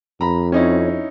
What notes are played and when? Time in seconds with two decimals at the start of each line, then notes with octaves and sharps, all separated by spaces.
0.21 F2 A#5 B5
0.52 C4 C#4 D#4 E4 C#5